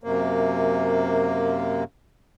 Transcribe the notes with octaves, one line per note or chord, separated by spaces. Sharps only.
F#2 C3 A#3